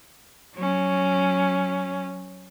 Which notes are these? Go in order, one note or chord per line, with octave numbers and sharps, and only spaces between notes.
F#3 C#4